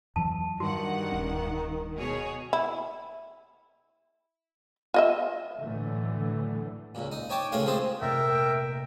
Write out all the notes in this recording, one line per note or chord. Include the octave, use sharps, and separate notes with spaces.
F2 E3 F#3 A5
G2 D#3 F#4 F#5
D1 C#4 D4
B2 G#4 C#5
E4
F4 D#5 E5
A2 D3 E3 F#3 A3
C#2 A#2
D#4
D#4 C#5 G5 A5 D6
C#2 A2 C#4 F4 A#4 F5
F3 C4 G#4 C5 A5
F1 A#2 A#4 E5 G5 A6